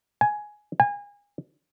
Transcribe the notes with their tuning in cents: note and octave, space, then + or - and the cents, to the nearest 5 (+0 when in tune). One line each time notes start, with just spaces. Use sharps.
G#5 +10
G#5 -30